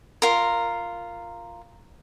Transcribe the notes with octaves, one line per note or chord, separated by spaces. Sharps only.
F4 A#4